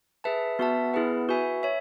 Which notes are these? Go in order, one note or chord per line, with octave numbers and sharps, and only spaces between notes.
G#4 B4 E5 A5
B3 F#4 B4 E5 A5
B3 E4 G#4 B4 F#5
F#4 B4 E5 G#5
C#5 E5